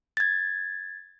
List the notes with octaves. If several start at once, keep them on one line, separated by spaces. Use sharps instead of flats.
G#6 A6